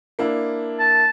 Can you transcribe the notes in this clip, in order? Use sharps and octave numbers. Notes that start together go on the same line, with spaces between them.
A#3 D4 E4
A5